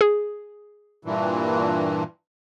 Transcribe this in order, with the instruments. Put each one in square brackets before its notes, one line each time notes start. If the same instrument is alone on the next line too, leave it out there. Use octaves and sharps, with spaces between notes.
[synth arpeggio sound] G#4
[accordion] G2 A#2 E3